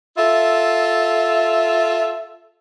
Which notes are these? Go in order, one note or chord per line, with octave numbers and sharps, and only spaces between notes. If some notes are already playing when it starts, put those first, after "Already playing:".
F4 A4 E5